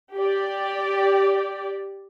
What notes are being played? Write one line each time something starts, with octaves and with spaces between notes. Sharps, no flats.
G4 D5